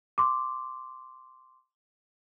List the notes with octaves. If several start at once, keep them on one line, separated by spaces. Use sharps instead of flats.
C6 D6